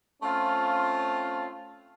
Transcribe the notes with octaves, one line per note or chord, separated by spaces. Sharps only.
A3 C4 C#4 F4